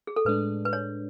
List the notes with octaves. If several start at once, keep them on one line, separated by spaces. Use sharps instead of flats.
G#4
A4
A2 G#3 D4 B4
B4
C#5